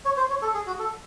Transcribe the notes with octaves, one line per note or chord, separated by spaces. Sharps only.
C#5
C5
C#5
A4
G#4
F#4
A4